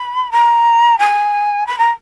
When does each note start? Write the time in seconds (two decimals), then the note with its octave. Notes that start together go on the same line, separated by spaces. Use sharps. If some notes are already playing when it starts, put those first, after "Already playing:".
Already playing: B5
0.31 A#5
0.99 G#5
1.67 B5
1.78 A#5